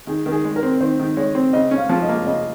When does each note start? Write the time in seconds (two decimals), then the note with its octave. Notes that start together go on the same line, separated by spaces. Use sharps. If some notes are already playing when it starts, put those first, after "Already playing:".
0.07 D#3 G#4
0.26 D#3 A#4
0.32 G#4
0.44 G#3
0.56 A#4
0.63 C4
0.81 D#3 C5
0.99 D#3
1.17 G#3 C#5
1.35 C4
1.53 C#3 D#5
1.71 C#4
1.78 F5
1.89 F3
2.02 D#5
2.09 A#3
2.27 C#3 D#5